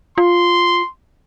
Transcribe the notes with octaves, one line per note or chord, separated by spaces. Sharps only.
F4 C6